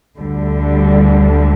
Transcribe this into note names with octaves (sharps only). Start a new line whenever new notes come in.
D2 D3 G3